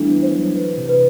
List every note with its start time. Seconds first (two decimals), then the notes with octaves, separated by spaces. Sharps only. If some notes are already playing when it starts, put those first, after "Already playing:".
Already playing: E3 G3 A3 B3 D4 E4 A4
0.11 E3
0.23 C5
0.33 F#3
0.55 E3 B4
0.78 C3
0.89 B4